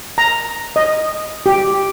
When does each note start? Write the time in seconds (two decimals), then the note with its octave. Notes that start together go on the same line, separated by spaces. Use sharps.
0.18 A#5
0.76 D#5
1.46 G4